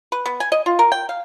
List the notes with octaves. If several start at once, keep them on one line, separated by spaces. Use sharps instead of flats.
B4
B3
G#5
D#5
F4
A#4
G5
F5